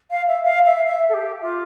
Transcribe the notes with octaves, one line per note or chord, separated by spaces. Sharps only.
F5
E5
F5
E5
E5
A4
G4
F4